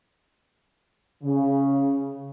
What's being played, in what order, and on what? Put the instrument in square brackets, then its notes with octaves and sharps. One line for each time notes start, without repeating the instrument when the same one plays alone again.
[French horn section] C#3